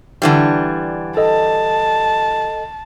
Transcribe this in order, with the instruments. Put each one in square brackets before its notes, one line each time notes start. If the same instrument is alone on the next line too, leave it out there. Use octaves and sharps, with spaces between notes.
[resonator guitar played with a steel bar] D3 E3 G3
[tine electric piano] A4 D#5 [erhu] A5